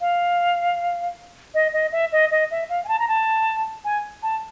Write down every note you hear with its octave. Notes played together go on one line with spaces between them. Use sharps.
F5
D#5
D#5
E5
D#5
D#5
E5
F5
G#5
A5
A#5
A5
G#5
A5